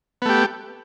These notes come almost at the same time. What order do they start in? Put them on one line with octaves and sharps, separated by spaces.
B3 A3 G4